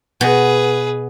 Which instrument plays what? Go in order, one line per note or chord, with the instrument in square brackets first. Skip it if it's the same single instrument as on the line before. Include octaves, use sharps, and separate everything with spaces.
[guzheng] B2 [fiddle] G#4 B4